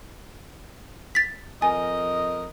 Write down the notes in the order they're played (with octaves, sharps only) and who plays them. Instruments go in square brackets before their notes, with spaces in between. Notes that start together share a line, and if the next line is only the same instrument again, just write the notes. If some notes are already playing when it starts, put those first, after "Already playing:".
[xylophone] A6 B6
[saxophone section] F2 A#4 D#5 [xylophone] G#5